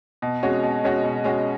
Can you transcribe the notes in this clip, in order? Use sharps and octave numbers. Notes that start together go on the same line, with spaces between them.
B2
G#3 C#4 F#4
B2
G#3 C#4 F#4
B2
G#3 C#4 F#4